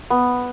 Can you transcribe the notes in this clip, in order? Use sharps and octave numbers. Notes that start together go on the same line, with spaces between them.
B3